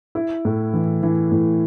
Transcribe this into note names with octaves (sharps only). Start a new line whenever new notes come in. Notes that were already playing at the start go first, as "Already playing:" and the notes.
E4
A2
E3
E3
A2